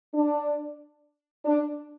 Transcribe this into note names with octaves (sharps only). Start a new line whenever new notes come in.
D4
D4